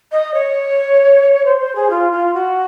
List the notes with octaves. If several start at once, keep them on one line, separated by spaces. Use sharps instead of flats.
D#5
C#5
C5
C5
G#4
F4
F4
F#4